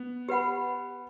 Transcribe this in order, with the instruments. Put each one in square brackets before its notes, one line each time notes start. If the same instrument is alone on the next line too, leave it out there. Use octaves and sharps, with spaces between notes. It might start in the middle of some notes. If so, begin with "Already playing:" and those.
Already playing: [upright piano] B3
[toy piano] G4 B4 F#5 B5